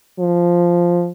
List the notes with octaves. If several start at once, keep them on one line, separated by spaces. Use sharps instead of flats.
F3